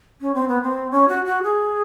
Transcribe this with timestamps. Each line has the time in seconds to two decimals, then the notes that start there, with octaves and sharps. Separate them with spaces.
0.21 C#4
0.34 C4
0.48 B3
0.63 C4
0.91 C#4
1.08 F#4
1.25 F#4
1.43 G#4